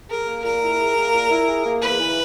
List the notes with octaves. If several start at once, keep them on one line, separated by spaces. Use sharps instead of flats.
G#4 A#4
A#3
A#2 A#4
E4
G#4
A#3
A#2
E4
G#4
A#3
E2 B4
E3